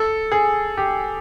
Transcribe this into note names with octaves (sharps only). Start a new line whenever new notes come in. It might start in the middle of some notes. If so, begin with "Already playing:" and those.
Already playing: A4
G#4
G4